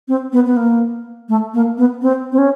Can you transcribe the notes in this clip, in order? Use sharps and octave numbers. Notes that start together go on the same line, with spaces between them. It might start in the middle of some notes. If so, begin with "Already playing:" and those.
C4
B3
B3
A#3
A3
A#3
B3
C4
C4
C#4